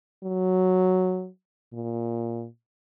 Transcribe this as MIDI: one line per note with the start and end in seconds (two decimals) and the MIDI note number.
0.24 1.28 54
1.73 2.46 46